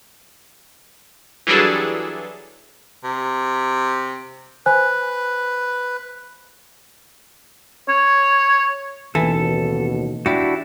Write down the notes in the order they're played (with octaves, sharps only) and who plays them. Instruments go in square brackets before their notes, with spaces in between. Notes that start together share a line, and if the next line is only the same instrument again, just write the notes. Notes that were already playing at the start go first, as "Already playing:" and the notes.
[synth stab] E3 F#3 G3 D4 G#4 A4
[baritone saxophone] C3
[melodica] B4 [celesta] C5 G#5 F#6
[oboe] C#5
[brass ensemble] A1 D#2 B2 [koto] E3 [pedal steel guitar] A4
[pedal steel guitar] D4 E4 F#4 [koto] G4